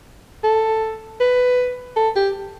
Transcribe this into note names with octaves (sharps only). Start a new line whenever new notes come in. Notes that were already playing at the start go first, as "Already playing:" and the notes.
A4
B4
A4
G4